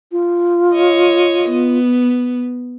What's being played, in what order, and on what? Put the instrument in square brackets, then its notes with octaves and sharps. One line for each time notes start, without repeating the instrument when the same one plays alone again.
[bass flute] F4
[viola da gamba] C#5 D#5
B3